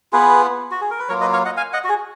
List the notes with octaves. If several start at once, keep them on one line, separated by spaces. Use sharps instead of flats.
B3 F4 G#4 B4
F#4
G#4
A#4
B4
F#3 A#3 F4 A#4 C#5
B4 D#5
C#5 F5
D#5 F#5
F5 G#5
D#5 F#5
F#4
G#4